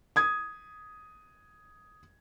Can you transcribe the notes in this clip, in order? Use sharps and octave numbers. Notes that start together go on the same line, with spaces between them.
D#6 G#6